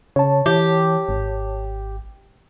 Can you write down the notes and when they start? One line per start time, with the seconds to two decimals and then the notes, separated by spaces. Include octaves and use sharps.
0.16 C#3 C#5 A5
0.46 E3 G4
1.09 G#1